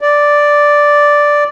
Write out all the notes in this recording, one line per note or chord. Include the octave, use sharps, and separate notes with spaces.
D5